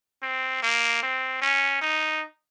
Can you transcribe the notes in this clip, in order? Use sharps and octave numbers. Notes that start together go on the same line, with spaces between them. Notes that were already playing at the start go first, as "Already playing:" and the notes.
C4
A#3
C4
C#4
D#4